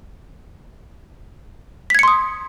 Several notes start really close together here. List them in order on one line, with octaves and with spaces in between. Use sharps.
B6 G#6 C#7 C6 D#6